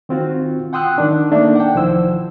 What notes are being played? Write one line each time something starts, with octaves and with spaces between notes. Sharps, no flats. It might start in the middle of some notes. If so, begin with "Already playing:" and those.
D#3 C4 F4 F#4
F#5 G5 C6 D#6 E6 F#6
D#3 D4
A3 A#3 D4 D#4 D5 E5
F#5 G5
C2 D#3 F3 E4 C5 E6